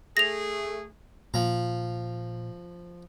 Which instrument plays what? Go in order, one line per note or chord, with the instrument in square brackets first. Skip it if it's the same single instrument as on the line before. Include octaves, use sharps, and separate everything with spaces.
[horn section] A3 G#4 [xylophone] A#6 F7
[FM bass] A#2 [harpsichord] F3 A#5